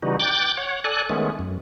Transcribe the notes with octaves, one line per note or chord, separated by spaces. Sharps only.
C#3 E3 G3 D#4 F#4
G5 D6 F#6 G6 A6
C#5 F#5
A4 D5 G#5 F#6
D#3 G#3 A3 B3 C#4
F#2